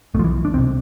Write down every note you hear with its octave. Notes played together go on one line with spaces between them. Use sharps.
B1 B2 F3 A3
E3
D4
C2 B2 C4